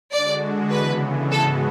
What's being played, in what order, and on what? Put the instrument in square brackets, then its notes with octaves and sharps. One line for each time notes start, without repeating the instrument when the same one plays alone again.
[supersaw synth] D3 G#3 D4 F#4 [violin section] D5
[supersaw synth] C#3 E3 B3 [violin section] B4
[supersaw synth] G#2 G#3 B3 F#4 [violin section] A4